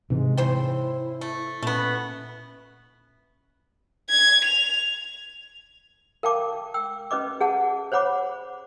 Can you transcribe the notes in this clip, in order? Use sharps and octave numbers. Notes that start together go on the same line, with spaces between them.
G#2 C3 E3 G#3
C#3 E4 C5 G5
A3
A#2 A3 B3 C#4 C#6
G#6
F7
A#4 F5 G5 A5 D6
G5 E6
C#4 B4 D#5 D6
G#4 F#5 A5
C5 C#5 F#5 B5 D6